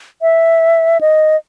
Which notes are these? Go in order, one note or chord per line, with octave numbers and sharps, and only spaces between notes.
E5
D#5